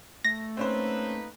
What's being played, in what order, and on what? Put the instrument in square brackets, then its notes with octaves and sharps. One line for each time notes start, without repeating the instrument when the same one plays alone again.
[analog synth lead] A3 [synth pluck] A#6
[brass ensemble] A#3 D#4 B4 [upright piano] C4 C#4 C5